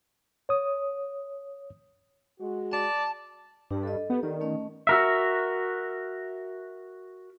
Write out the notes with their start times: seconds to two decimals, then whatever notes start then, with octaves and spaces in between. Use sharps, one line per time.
0.49 C#5 D#6
2.39 G#3 F#4
2.73 D5 A5
3.71 G2 D4 G4
3.83 A4 D#5
4.10 B3 G4 A4
4.23 D#3 D5
4.41 A3 C#4 D#5
4.87 F#4 A#4 E5